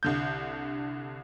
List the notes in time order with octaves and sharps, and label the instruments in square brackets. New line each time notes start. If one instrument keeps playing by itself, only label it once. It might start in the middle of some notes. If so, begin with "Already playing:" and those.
[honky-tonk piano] C2 D3 G6